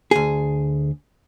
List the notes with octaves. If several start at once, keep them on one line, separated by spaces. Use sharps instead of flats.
D2 G#4